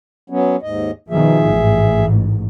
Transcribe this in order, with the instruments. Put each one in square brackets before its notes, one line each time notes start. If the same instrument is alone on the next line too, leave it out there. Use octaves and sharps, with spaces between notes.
[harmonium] F#3 B3 C#4
D#2 G#2 D#5
[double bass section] B2 D#3 F3 [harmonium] G#4 E5
[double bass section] A1 G#2